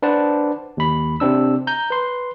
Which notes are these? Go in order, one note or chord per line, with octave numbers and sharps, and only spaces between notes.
D4 B4 C5 F#5 A5
D#2 B5
C3 C4 D4 E6
A#5 G6
B4 C6